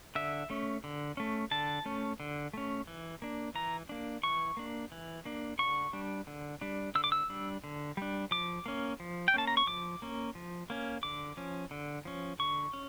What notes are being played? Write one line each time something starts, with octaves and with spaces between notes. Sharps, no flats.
D3 E5
A3 C#4
D3
A3 C#4
D3 A5
A3 C#4
D3
A3 C#4
E3
A#3 D4
E3 A#5
A#3 D4
E3 C#6
A#3 D4
E3
A#3 D4
D3 C#6
G3 D4
D3
G3 D4
D3 E6
D6
E6
G3 D4
D3
G3 D4
F3 D6
A#3 C#4
F3
G5
A#3 C#4 A5
A#5
C#6
F3 D6
A#3 C#4
F3
A#3 C#4
D3 D6
F3 C#4
D3
F3 C#4
D3 C#6
C#4